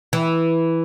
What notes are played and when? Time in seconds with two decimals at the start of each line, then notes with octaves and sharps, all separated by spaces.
0.13 E3